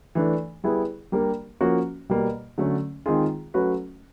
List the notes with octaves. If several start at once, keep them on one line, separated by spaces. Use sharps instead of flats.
E3 A3 D4
G3 B3 E4 G#4
G3 A#3 D4 G4 A#4
F3 A#3 C#4 F#4
B2 G3 A#3
D3 F#3 A3 C#4
D#3 G#3 C4 F4 G#4
F#3 A3 C#4 F#4 B4